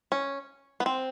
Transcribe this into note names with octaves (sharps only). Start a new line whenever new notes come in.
C#4
B3
C4